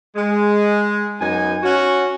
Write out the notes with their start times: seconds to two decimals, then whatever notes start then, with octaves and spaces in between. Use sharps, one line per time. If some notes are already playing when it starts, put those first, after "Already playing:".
0.15 G#3
1.21 F#2 B3 D#4 G#5
1.63 C#4 F#4